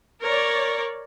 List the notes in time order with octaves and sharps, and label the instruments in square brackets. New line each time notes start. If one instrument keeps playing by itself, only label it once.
[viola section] A#4 C#5 D5